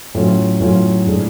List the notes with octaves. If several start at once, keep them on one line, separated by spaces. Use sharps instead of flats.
A2 F#3 C#4 F4
A2 F#3 C#4 F4
A2 G#3 D4